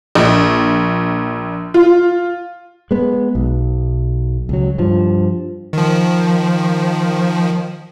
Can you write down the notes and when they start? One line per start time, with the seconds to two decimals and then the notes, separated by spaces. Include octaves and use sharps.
0.15 A#1
1.74 F4
2.91 G#3 B3
3.35 B1
4.49 C#2 F#3
4.78 G2 F3
5.73 D#3 F3